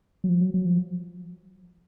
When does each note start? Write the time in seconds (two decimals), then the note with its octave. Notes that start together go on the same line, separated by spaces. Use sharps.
0.24 F#3
0.29 F3
0.41 F#3
0.54 F#3
0.65 F3